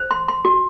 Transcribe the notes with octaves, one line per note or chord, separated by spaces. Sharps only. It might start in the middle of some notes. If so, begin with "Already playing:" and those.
Already playing: C5
C6
C6
F#4